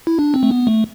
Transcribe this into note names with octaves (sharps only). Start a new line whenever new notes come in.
E4
D4
C4
A3
B3
A3